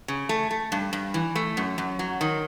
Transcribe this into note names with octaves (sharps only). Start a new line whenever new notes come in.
C#3
A3
A3
G2
G2
E3
A3
F#2
F#2
F#3
D#3